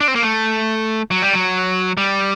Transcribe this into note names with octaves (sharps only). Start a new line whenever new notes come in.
D4
C4
A#3
A3
F#3
G3
F#3
G3